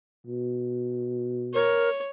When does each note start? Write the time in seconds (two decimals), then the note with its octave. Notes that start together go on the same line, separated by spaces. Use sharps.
0.27 B2
1.54 A#4 C#5